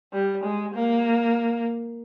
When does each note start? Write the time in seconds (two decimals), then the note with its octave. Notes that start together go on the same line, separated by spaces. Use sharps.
0.13 G3
0.44 G#3
0.75 A#3